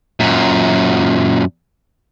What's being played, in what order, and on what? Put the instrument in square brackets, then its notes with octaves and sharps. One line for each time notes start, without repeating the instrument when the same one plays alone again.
[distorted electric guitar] F#2 A#2